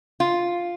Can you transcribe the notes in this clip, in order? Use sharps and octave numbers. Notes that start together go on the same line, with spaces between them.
F4